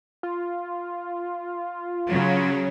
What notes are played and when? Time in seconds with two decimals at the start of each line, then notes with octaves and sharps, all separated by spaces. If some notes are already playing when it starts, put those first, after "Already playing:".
0.23 F4
2.08 C#3 F#3